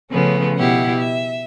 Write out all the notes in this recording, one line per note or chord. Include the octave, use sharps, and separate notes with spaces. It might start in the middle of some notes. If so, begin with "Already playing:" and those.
C#3 F3 A3 B3 C#4
B2 E4 G4 F#5
E5